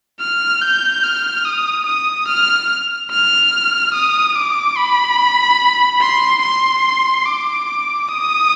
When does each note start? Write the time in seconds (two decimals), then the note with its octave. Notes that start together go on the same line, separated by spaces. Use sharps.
0.20 F6
0.61 G6
1.03 F6
1.45 D#6
1.86 D#6
2.28 F6
3.11 F6
3.94 D#6
4.35 D6
4.77 B5
6.01 C6
6.42 C6
7.26 D6
8.09 D#6